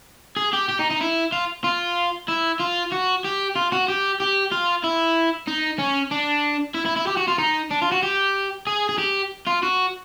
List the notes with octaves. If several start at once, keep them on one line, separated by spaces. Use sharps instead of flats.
G#4
G4
G4
D#4
D#4
E4
F4
F4
E4
F4
F#4
G4
F4
F#4
G4
G4
F4
E4
D#4
C#4
D4
E4
E4
E4
G4
F#4
F4
D#4
D4
F4
F#4
G4
G#4
G#4
G4
F4
F#4